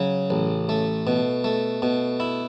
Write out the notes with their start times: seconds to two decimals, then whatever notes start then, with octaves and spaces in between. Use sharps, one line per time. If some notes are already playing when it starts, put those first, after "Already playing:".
Already playing: C#3 F#3
0.30 A1
0.69 A3
1.07 B2
1.44 A3
1.82 B2
2.20 E4